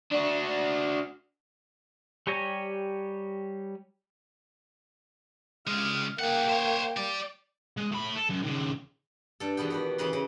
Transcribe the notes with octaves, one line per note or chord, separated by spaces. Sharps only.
D4 F#4
G3 G4 C#5 G#5 A#5
C#2 G#3 F6
A#3 G#4 F#5 G5
C5 C#5
G4 D5
G#3
A2 B5
A4
F#2
D#2 C#3
G2 A4
E2 B2 D#3 B3 G5
F#4 G4 B4
C#3 E3 D#4 B4 A#5 C6
C#3